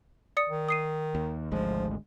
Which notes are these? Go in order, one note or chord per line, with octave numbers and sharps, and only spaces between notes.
D5 D#6 C#7
D#3
D#6 C7 D#7
D#2
G#1 D2 F3 G#3